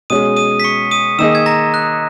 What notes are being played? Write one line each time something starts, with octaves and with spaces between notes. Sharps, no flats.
B2 G#3 C#4 G#4 D#6 D#7
D#6 D#7
B6
C#6 C#7
D#6 D#7
D#3 A#3 D#4 G#4 E6 E7
G#6
A#5 A#6
F#6